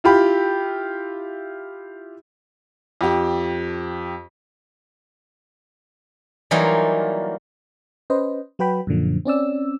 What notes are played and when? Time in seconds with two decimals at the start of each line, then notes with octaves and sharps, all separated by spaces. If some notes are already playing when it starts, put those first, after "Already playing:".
0.04 E4 F4 G4 B5
3.01 F2 G4
6.51 E3 F#3 G3 A#3 D#4 F4
8.10 C#4 B4 C5 D#5
8.59 F#3 F#4 B4 G5 B5
8.87 F#2 A#2 D3 F3
9.25 C4 C#4 D5 E6